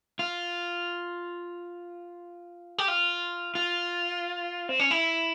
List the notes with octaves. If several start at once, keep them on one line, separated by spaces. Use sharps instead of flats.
F4
G4
F4
F4
C4
C#4
E4